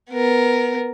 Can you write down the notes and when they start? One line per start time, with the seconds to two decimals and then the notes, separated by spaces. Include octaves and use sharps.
0.11 B3 A#4